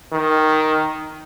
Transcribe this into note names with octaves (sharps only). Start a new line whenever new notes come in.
D#3